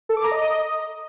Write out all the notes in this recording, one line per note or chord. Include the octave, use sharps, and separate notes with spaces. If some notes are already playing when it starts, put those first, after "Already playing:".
A4
D6
A#5
D#5